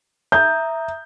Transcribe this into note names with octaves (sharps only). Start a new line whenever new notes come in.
E5 A#5 D#6 G6